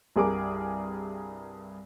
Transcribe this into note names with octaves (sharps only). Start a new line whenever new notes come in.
C2 G2 G#4 A#4 D6